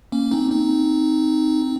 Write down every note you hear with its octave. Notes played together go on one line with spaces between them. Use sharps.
A#3 C#4
C4 D#4
C4 D#4